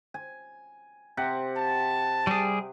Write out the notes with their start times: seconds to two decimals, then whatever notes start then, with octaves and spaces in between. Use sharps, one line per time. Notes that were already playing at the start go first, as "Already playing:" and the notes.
0.14 G#5
1.17 C3 F#5
1.56 A5
2.27 G3 G#4